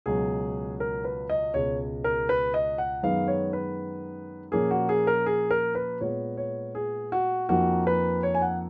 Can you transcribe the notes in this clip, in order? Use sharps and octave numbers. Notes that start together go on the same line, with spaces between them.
C#2 B2 F#3 G#4
A#4
B4
D#5
C#2 B2 G#3 C#5
A#4
B4
D#5
F#5
F#2 D#3 G#3 B3 F5
C#5
B4
A#2 F3 A#3 C#4 G#4
F#4
G#4
A#4
G#4
A#4
B4
A#2 G#3 B3 C#5
C#5
G#4
F#4
F2 F3 A#3 D#4 F#4
B4
C#5
G#5
F#5